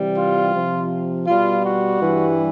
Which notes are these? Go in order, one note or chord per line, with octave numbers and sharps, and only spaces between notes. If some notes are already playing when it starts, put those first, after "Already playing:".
Already playing: C3 E3 G3
F4
C3 F3
B2 G3 F4
F#4
G2 E3 G3